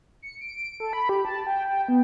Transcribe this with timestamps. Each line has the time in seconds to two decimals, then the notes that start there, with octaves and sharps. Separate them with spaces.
0.22 C#7
0.41 D7
0.80 A4
0.93 B5
1.09 G4
1.25 A5
1.46 G5
1.69 G5
1.89 B3